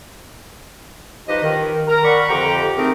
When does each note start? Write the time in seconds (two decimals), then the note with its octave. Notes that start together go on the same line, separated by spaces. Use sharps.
1.27 F3 D#4 G4 B4 D#5
1.42 D#3
1.88 A#4 A#5
2.04 D5 F#5 B5 C#6
2.28 F2 D3 G4 G5 A#5
2.77 A3 C4 D#4 G4 G#4 A#4